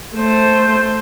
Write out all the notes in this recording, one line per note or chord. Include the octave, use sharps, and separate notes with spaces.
A3 C5